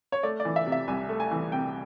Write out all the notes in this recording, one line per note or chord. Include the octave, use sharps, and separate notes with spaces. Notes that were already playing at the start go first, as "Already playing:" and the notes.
C#5
A3 D5
D5
E3
E5
C3
E5
C2 G#5
A3
G#5
E3
C3 G5